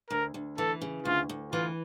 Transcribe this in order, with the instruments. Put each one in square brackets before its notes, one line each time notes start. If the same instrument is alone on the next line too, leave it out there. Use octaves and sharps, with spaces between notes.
[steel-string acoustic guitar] D2 [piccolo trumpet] A#4
[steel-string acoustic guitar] D2
[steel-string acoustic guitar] E3 [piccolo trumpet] A4
[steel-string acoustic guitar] C#3
[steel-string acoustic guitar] D2 [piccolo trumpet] F4
[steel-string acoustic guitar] D2
[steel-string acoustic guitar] E3 [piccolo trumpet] F4